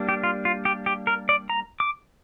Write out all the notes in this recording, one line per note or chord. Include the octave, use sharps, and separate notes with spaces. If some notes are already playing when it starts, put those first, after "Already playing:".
Already playing: G3 A#3 D4
G4
F4
F4
G4
G4
A#4
D5
A#5
D6